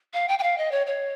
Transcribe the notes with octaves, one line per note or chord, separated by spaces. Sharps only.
F5
G5
G5
F5
D#5
C#5
C#5